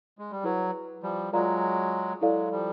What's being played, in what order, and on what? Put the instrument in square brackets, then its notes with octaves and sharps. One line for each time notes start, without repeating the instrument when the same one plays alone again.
[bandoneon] G#3
G3
[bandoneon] F#3 [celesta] E4 G#4 B4
[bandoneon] F3 G3
[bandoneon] F#3 G#3 [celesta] F4 A#4 D5 F5 A#5
[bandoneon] F#3 G#3 [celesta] E4 A4 D5 F5
[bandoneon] F3 G3